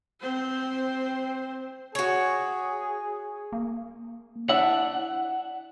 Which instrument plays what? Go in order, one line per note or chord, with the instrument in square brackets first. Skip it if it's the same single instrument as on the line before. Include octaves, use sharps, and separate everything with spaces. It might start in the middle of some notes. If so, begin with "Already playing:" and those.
[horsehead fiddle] C4 C5
[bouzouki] F#4 C#5 [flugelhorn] G#4
[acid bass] A#3
[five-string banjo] D4 E5 [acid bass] E4 [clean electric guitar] F#5